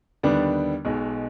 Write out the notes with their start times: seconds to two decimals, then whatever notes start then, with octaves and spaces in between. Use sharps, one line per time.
0.23 D#2 D3 G3 B3 D4
0.85 B1 B2 G#3